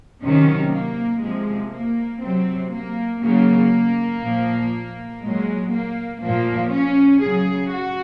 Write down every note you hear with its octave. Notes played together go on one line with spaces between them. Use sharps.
C3 D#3 F#3 C#4
A#3
C3 F3 G#3
A#3
C3 F#3 C4
A#3
C#3 F#3 A#3
A#2 F3
A#2 F#3 G#3
A#3
A#2 F3 A#3
C#4
C#3 F#3 G#4
F#4